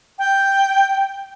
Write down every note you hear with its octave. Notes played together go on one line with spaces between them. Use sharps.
G5